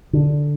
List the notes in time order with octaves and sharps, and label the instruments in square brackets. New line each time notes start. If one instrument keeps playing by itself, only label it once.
[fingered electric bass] D3